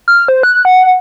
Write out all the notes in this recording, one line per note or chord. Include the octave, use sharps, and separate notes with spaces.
F6
C5
F#6
F#5